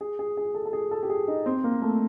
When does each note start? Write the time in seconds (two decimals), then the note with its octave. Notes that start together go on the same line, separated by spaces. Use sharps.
0.01 G#4
0.19 G#4
0.37 G#4
0.55 A4
0.66 A4
0.73 G#4
0.91 A4
1.03 G4
1.10 G#4
1.28 D#4
1.46 C4
1.64 A#3
1.82 A3